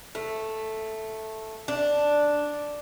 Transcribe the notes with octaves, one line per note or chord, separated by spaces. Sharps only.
A3
D4